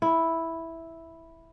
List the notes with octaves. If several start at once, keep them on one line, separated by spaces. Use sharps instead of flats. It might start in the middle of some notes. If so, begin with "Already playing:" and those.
E4